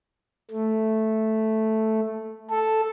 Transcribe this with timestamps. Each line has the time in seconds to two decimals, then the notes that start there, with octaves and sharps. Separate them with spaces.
0.51 A3
2.50 A4